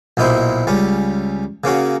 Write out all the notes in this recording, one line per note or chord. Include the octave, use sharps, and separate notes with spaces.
B1 A#2 D#4 E4 C5
C#2 G3 C#4
C#3 A#3 C#4 F#4